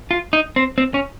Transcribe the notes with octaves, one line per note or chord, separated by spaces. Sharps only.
F4
D#4
C4
C4
C#4